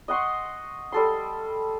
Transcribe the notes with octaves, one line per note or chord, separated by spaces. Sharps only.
D#5 F#5 C6 C#6
G3 A4 C6